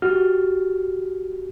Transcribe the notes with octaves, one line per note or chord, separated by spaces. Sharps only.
F#4 G4 F6